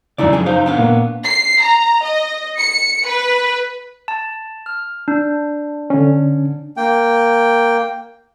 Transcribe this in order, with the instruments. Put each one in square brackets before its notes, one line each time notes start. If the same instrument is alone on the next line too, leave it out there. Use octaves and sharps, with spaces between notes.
[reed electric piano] F#2 C#3 [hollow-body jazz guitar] D#4 E4 D5
[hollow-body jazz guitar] F2 G#2 G#4
D#4 C5 F5
B3 D4 F5
[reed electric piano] A#2 A#3
[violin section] C7
A#5
D#5
C#7
B4
[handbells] A5
F6
D4
[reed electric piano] D3 C#4
[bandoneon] A#3 G5